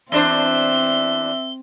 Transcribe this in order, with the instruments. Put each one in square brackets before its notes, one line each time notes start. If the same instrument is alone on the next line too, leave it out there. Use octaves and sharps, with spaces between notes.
[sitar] E2 D4 C5 [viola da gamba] C4 [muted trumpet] E5 [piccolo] G7